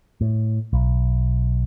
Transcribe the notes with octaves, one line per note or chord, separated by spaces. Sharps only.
A2
B1